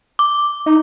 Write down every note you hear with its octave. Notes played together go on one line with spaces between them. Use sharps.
D6
D#4